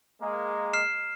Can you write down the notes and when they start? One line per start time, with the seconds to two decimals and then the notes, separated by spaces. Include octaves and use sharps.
0.22 G#3 A#3
0.73 F6 C7 E7